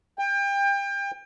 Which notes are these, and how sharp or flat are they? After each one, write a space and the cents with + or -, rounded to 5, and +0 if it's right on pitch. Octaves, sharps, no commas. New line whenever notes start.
G5 +30